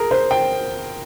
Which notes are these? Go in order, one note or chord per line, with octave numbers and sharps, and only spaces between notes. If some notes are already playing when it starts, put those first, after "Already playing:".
Already playing: G#4 A#4
C5
G5